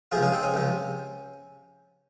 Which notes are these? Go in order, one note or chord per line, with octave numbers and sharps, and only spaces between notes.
C#2 C3 F3 F4 G#4
C#4 F4
C4 D#4
C#4
C#2 C3 F3